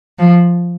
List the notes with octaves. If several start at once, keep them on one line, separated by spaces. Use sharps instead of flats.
F3